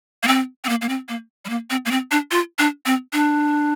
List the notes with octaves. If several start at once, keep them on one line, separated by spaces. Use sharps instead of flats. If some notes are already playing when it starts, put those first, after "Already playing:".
A#3
C4
C4
A#3
A#3
C4
A#3
G3
A#3
C4
A#3
C4
D4
F4
D4
C4
D4